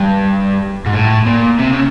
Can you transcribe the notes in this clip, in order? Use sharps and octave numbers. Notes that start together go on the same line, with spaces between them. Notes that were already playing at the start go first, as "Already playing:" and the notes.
Already playing: G2
G#2
A2
A#2
C3
C#3